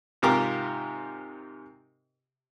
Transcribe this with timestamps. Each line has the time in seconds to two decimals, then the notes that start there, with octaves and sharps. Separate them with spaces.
0.22 G#2 C3 F4 G4 A#4 D6